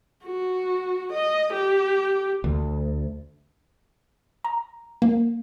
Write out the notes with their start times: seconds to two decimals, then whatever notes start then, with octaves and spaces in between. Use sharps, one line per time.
0.25 F#4
1.13 D#5
1.54 G4
2.44 D2
4.44 A#5
5.02 A#3